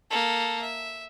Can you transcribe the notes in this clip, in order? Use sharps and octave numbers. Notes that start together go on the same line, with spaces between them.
A#3 A4
E5